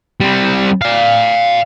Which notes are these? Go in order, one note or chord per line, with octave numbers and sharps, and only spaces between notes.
G3 C4
D5 F5